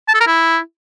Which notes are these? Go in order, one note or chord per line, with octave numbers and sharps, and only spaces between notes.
A5
A4
A#4
E4